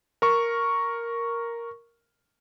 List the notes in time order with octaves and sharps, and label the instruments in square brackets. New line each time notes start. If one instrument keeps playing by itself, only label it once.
[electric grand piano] A#4 C#6